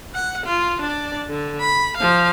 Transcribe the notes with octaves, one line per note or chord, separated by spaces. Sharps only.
F#5
F4
D4 D5
D3
B5
F3 F5